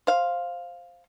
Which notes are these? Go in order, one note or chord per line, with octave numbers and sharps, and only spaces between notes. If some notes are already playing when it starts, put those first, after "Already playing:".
C5 F5